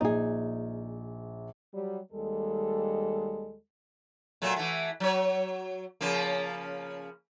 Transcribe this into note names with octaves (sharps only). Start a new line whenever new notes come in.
A#1 D#4 G#4
F#3 G3
D#2 G3 G#3 A4
A#2 F#3 A3
E3 A3
F#3 C#5
C#3 F3 A#3